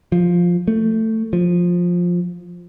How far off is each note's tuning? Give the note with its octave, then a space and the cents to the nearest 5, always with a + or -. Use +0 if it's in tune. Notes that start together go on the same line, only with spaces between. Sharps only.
F3 +5
A3 +15
F3 +10